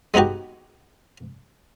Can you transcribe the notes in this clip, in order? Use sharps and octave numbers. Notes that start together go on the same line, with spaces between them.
G#3 B3 D#4 F#4 G4